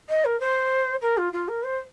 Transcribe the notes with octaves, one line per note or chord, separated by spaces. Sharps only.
D#5
A#4
C5
A#4
F4
F4
A#4
C5